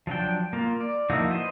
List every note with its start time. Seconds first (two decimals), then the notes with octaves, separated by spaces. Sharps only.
0.07 F3 F#3 D4 G5
0.53 A#3 F4
0.80 D5
1.10 F3 A#3 D#4 E4 F#4
1.31 B4 C5 D#5